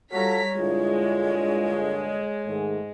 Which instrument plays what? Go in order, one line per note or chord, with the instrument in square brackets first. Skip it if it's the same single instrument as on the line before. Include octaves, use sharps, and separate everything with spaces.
[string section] G3 A#5 B6 [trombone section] F4 F#4 A4 [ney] C#5
[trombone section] G2 A#2 D3 [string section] G#3 [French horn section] E4 F4
[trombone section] G#2 [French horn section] D#3 A3 G#4